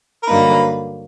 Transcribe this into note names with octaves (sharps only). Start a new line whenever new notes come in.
A#4
G2 D3 F#3 A#3 D#4 B4